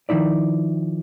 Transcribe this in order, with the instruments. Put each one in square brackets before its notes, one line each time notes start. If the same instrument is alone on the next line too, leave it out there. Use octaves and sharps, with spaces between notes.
[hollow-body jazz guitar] D#3 F3 D#4 E4 D5